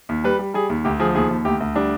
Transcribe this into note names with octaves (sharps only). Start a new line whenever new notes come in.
D#2
G3 B4
G3
G3 G#4
D#2
D2 G4
F3 G#4
D#2 G#4
D#2
D2 G4
D2
G3 D4